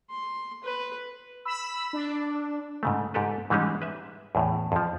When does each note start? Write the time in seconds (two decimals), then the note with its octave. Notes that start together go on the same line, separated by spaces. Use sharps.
0.10 C6
0.64 B4
1.45 B5 E6
1.93 D4
2.83 G#2 C#3 A3
3.14 G#2 G4 A4 B4
3.50 G#2 E3 G3 G#3 C#4 D#4
3.82 B4 E5
4.35 E2 A2
4.72 F2 F3